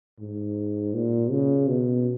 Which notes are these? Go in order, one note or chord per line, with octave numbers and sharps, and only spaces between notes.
G#2
A#2
C#3
B2